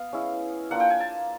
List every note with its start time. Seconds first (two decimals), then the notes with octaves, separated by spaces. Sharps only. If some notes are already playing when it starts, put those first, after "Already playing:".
Already playing: B3 F5
0.13 G#3 C#4 E4
0.71 A#3 D4 F4 F#5
0.80 G5
0.90 G#5
1.00 A5